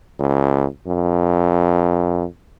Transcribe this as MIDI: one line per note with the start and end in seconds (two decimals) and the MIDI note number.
0.19 0.66 37
0.87 2.25 41